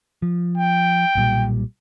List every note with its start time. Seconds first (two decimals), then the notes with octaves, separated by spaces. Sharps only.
0.22 F3
0.58 G5
1.15 B1 A#2 G3